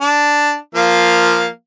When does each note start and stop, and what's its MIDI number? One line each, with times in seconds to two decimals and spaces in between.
0.01 0.55 62
0.75 1.47 53
0.75 1.47 58
0.75 1.47 77